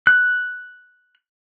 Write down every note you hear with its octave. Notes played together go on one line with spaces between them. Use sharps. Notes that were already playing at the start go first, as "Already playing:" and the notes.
F#6